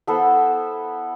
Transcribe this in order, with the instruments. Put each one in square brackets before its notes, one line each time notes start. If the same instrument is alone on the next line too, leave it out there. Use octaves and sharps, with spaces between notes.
[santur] B3 E4 A4 C5